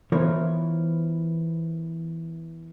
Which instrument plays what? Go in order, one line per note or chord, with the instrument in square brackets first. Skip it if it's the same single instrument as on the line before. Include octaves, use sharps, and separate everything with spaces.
[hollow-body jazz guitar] E3 B3 F4 A#4 C5 C#5